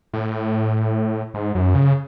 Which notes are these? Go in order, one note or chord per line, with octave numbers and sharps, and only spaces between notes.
A2
G#2
F#2
C#3